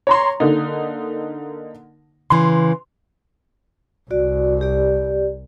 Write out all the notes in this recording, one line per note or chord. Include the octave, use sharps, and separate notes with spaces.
C#5 A#5 C6
D3 A#3 D#4
C#3 E3 C6
C2 F#4 D5
G4 D5